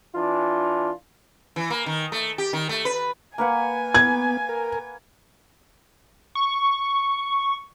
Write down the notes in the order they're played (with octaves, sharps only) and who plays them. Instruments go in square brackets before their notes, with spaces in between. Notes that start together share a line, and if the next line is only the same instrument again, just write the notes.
[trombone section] E3 D4 F4
[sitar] E3
A#3
D#3
A3
G4
D#3
A3
B4
[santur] A#3 B4 F#5 [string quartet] G#5
[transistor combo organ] B3 [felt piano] G#6
[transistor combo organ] A#4
[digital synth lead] C#6